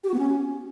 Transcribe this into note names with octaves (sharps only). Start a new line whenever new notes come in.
G4
F#4
B3
C#4